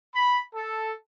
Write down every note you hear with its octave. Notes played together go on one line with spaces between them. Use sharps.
B5
A4